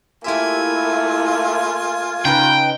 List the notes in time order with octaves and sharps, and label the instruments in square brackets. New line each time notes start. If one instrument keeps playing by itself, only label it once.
[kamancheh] A3 A#3 [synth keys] E4 G4 E5 [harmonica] F4 G#5
[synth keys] C#3 D#4 B4 [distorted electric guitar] G5